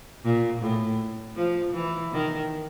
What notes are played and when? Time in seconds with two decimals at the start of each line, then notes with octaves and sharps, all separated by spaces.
0.23 A#2
0.61 A2
1.36 F3
1.74 E3
2.12 D#3